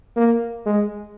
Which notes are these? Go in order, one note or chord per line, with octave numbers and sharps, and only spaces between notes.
A#3
G#3